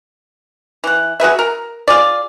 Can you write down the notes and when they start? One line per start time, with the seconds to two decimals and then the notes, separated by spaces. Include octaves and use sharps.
0.84 E3 F#5
1.20 F#4 G#4 B4 E5
1.39 A#4
1.88 F4 G#4 D5